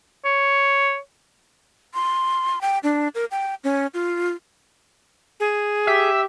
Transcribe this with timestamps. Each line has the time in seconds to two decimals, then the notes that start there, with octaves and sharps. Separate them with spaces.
0.25 C#5
1.94 C6
2.61 G5
2.83 D4
3.15 A#4
3.31 G5
3.64 C#4
3.94 F4
5.40 G#4
5.87 G4 E5